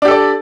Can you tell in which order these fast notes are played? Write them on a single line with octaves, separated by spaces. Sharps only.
D4 G4 A4 D5